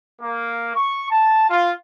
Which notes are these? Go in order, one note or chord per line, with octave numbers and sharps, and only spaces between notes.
A#3
C#6
A5
F4